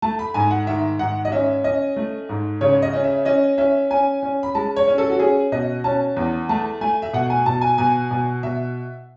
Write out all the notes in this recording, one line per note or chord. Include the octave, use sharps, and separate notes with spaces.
A3 A5
B5
G#2 G#5
F#5
D#3 E5
G#2 F#5
D#5
C#4 E5
C#4 D#5
A3
G#2
C#3 C#5
D#5
C#4
E5
C#4 D#5
C#4 E5
C#4 G#5
C#4
B5
G#3 A5
C#5
C#4
A4
F#4
C#4 G#4
B2 D#5
C#4 A5
E2
A3 A5
A3 G#5
E5
B2 F#5
G#5
B2 A5
G#5
B2 G#5
B2
B2 E5